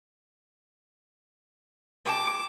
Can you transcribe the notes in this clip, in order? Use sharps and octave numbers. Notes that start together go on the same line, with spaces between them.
G#3 G5 A5 D6